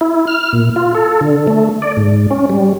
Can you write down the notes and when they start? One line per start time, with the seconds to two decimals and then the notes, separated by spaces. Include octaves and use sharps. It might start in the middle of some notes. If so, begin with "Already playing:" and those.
0.01 E4
0.27 F6
0.53 A#2
0.76 F4
0.95 A4
1.21 D3
1.47 A3
1.82 D5
1.97 G#2
2.31 C#4
2.50 G3